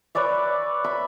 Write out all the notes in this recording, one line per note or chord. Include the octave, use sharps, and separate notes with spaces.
B4 C#5 D5 E5
E5 B5